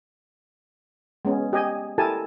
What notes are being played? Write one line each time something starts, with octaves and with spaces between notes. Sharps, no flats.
G#3 B3 C#4
G4 D#5 G#5
E4 G4 A4 A#4 G#5 A5